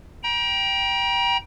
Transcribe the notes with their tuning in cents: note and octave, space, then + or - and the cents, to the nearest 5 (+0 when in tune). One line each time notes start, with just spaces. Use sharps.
G5 +0 A#5 +35